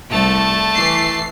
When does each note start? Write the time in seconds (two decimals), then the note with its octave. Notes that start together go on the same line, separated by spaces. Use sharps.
0.11 C2 A3 A5
0.74 E3 C7